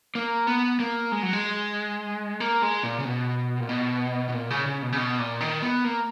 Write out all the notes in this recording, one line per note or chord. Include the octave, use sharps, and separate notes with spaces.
A#3
B3
A#3
G#3
F#3
G#3
A#3
G#3
A#2
C#3
B2
A#2
B2
B2
A#2
C#3
C#3
B2
C#3
B2
A#2
D#3
B3
A#3